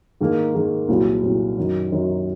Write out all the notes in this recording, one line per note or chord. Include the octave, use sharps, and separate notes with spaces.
G#2 D#3 A#3
G#2 D#3 A#3
C2 A#2 F#3
C2 A#2 F#3
F#2 D#3 F#3
F#2 D#3 F#3